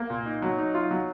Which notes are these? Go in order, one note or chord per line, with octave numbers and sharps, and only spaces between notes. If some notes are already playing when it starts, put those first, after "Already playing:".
Already playing: A#3
A#2
D#4
F#3
D#4
F4
F#3